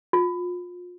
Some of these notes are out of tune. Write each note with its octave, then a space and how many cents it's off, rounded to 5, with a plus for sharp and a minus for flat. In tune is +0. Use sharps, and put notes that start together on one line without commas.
F4 +30